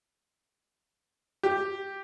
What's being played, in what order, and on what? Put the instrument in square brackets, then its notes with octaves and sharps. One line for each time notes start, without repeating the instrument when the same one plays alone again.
[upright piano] G4